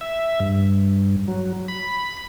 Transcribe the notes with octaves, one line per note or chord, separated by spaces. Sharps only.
E5
G2
F#3
B5